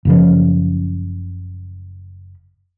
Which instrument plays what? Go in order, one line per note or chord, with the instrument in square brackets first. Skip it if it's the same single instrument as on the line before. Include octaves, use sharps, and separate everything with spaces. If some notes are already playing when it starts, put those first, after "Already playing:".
[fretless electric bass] F#1 C#3 F3